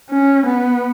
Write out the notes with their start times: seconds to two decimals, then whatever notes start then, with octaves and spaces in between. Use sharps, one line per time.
0.10 C#4
0.46 B3